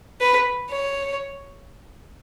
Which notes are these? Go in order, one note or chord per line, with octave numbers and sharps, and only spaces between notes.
B4
C#5